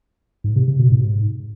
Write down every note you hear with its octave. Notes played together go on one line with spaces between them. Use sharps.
G#2
C3
C3
B2
G#2